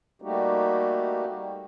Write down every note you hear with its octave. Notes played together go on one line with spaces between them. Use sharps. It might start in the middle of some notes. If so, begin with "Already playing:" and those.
G3 A3 A#3 D#4 F#4 G4